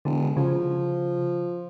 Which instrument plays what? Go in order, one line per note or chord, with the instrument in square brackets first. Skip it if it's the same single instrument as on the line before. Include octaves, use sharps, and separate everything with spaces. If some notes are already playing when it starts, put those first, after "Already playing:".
[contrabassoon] E1 [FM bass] D3
[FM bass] C#3 [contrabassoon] F3